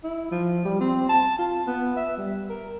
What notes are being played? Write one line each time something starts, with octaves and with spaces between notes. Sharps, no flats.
E4
F3
G3
C4
A5
F4
B3
E5
G3
A#4